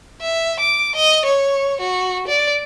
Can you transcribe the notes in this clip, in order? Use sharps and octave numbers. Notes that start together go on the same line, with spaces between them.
E5
D6
D#5
C#5
F#4
D5